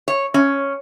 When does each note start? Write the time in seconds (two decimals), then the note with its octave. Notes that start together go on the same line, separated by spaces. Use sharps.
0.08 C#5
0.34 C#4